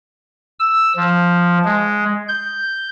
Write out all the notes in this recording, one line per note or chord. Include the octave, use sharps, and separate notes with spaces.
E6
F3
G#3
G6